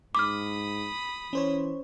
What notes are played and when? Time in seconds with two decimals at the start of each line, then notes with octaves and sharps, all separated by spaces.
0.15 G#2 B5 D6 D#6 F6
1.33 E3 C#4 C5 C#5